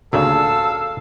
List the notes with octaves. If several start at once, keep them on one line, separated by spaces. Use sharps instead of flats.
D2 A#2 C#3 A4 F5 E6